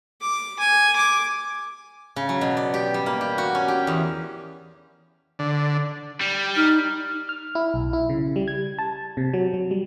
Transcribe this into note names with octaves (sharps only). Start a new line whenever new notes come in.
D6
G#5
D6
C#3
F#3
B2
D5
G4
G3
A#3
G4
F#4
C#4
G4
E2
D3
G3
D#4 F6
F6
E4
B1
E4
C#3
G3
G#6
A5
C3
F#3
F#3
G3